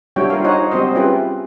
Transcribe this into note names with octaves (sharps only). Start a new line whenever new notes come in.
G3 D4 E4 F#4 C#5 G5
F4 A#4 F5
D#4 C5 C#5 D#5 F#5 G#5
G3 C4 F#4 C5 D#5
C#4 E4 F4 G4 G#4 B4